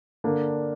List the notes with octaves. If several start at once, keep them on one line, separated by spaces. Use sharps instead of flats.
D3 A#3 D4